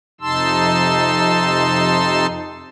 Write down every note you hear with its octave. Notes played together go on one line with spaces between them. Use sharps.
F2 C3 D#4 A5 C6 E6